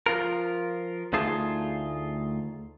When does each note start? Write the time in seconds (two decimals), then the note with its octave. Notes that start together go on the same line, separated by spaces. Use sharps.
0.06 F3 F4 A#4
1.13 D2 A3 D#4 F4 G#4 A5